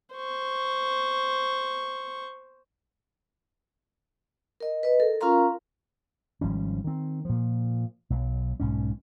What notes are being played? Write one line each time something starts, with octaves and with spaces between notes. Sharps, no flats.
C5 C#6
A#4 D#5
B4 D#5
A4 A#4
C#4 F4 A#4 F5 A#5 C6
G#1 F3 G3 C#4
D#3 C4
A#2 F3
B1 F#3
B1 G#2 C#4